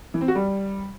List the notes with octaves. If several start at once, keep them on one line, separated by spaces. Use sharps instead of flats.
E3
C4
F#4
G3